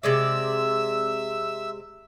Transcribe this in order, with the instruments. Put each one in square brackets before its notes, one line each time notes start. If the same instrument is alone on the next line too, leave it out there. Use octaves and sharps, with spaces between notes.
[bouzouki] C3 G#3 D5 [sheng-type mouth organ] E5 E6